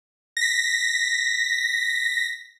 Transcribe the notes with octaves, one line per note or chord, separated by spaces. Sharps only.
A#6 B6